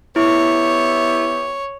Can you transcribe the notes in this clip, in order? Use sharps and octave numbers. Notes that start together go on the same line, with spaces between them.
B3 E4 G4 C#5 E5